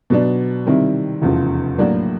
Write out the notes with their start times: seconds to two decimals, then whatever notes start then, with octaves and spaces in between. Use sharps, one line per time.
0.10 B2 F#3 B3 D4
0.66 C3 D#3 G3 C4 E4
1.22 F1 E2 C#3 F3
1.78 A2 F#3 A#3 D4 F#4